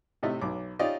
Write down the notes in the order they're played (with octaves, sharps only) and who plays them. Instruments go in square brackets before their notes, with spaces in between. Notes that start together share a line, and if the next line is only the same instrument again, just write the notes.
[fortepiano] A2 C3 A3 D#5 E5
B1 F#3 D6
C#4 D#4 F4 G4 D5 D#5